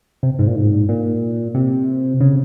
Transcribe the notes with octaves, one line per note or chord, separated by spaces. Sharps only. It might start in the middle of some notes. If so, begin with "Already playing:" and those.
C3
G#2
A#2
G#2
A#2
C3
C#3